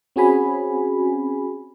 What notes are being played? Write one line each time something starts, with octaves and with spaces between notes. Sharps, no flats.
C4 C#4 F#4 G#4 G#5 B5